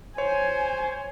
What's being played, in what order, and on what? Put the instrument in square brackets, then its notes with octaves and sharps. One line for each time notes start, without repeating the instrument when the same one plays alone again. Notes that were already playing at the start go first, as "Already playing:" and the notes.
[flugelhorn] C5 [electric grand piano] C#5 [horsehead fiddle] G#5